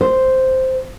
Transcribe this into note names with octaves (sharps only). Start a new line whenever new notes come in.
C5